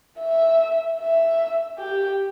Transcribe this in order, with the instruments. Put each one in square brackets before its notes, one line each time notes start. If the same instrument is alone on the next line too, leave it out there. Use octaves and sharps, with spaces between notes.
[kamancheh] E5
E5
G4